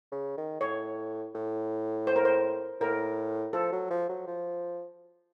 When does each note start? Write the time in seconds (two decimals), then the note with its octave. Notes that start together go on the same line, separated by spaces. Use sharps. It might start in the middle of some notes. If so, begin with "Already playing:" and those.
0.12 C#3
0.37 D#3
0.61 A2 C#5
1.35 A2
2.07 C5
2.16 A#4
2.25 C5
2.81 A2 A#4
3.53 F3 A4
3.72 F#3
3.90 F3
4.09 F#3
4.27 F3